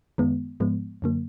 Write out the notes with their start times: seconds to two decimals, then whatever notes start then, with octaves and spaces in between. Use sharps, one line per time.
0.18 F#2 D#3 G#3 B3
0.60 G#2 F3 G#3 B3
1.02 F#2 D3 F#3 A#3